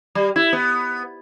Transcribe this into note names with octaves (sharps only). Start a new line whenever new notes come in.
G3
E4
B3